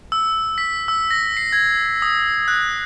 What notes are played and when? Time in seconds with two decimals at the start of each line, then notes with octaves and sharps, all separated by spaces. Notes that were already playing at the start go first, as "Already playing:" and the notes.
0.12 E6
0.58 B6
0.88 E6
1.11 A#6
1.37 C7
1.53 G#6
2.02 D#6
2.48 F#6